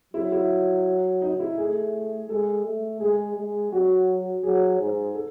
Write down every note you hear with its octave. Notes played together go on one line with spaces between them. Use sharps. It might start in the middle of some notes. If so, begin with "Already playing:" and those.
F#3 E4
E4
D#4
E4
A3 G#4
G#3 A4
A3
G#3 G#4
G#3
F#3 F#4
F#3 G#4
G#2
A4